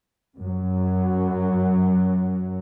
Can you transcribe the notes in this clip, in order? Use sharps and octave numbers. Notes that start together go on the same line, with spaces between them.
F#2 F#3